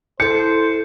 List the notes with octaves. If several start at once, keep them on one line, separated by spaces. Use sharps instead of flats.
E4 A4 C5 G6 C#7